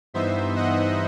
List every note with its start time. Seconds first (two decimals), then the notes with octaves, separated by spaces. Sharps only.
0.14 G2 E3 B3 D#4 C5 E5
0.56 D#5 F#5